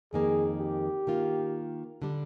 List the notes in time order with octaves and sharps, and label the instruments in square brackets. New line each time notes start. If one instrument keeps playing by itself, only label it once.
[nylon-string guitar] F2 D#3 A#3 [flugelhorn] G#4
[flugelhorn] G4
[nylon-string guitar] D#3 A#3 F4
D3 G3 D4